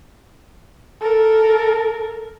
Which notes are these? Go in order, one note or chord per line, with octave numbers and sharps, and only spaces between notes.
A4 A#4